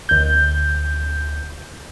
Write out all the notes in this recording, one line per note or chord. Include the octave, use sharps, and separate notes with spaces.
D2 G6